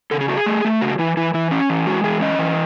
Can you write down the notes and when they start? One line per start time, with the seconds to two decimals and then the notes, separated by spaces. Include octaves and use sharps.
0.11 C#3 A4
0.20 G#4
0.28 A3 F#4
0.37 G#4
0.46 A3
0.65 A3
0.81 C#3 F#4
0.99 E3 E4
1.17 E3 E4
1.34 E3 E4
1.51 C#4
1.70 E3
1.86 G#3 F#4
2.04 E3 G#4
2.21 C#4 D#5
2.39 E3